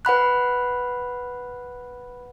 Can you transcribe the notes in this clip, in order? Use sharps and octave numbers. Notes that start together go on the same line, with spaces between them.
B4 F#5 B5 F#6